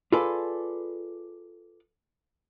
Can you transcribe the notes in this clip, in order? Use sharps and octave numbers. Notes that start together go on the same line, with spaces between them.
F4 G#4 A4 B4 D5